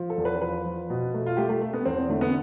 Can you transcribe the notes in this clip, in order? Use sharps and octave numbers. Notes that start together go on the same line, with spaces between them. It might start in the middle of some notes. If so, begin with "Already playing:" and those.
Already playing: F3
A4
E2
B4
F3 B4
F3
B2
A3
F4
A3 G4
A3
A3
B3
E2 C4
D3 A3
B3